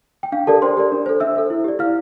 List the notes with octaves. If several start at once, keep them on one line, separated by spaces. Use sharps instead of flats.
G5
D4 F5
G4 A4 A#4 D5 A5
D4 C5 C6
G4 A#4 D5
D4
A4 C5
D4 E5 E6
A4 C5
E4
G4 D5
E4 F5 F6